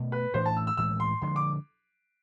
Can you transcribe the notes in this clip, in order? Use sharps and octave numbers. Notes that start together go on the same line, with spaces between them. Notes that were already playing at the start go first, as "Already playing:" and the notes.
Already playing: B2 A3
B4
A2 E3 A3 D4 C5
A5
E6
E6
A2 E3 G#3 E6
C6
D3 F3 G#3 C6
D6